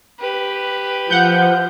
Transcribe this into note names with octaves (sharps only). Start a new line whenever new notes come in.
G4 B4
F3 F#5 G6